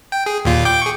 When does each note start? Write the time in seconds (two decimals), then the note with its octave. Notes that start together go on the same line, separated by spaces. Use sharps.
0.12 G5
0.26 G#4
0.45 D#2 A#2 F4
0.65 G5 D6 G6
0.82 G#4 C#6